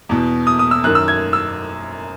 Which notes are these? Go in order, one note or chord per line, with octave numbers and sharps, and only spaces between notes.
E2 B2
D#6
D#6
E6
F#2 D#3 F#6
E6
G#6
E6